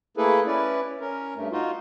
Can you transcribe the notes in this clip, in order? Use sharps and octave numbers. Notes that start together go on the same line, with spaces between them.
A3 A#3 E4 G#4 A4 B4
C#4 E4 B4 D5
C#4 A#4
G2 A3
D#4 F4 F#4